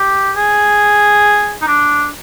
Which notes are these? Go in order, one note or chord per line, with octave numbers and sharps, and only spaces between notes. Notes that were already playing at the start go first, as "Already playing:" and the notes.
Already playing: G4
G#4
D#4
D4